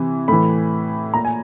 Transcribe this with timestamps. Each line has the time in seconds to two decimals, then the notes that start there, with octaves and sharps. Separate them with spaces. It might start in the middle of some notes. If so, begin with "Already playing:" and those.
Already playing: C3 E3
0.28 A2 E3 B5
1.14 A#2 A#5
1.25 G#5